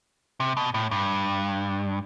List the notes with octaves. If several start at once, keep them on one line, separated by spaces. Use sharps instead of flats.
C3
B2
A2
G2